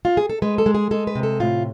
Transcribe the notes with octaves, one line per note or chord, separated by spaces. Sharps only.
F4
G#4
A4
G#3 B4
A4
G#3
G#4
G#3 A4
B4
C3
A4
A2 F4